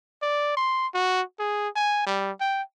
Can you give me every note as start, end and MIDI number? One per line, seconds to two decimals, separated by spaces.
0.22 0.56 74
0.57 0.87 84
0.94 1.22 66
1.39 1.69 68
1.76 2.05 80
2.06 2.31 55
2.40 2.62 79